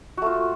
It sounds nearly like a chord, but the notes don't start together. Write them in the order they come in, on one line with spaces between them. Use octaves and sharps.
F#4 A3 F4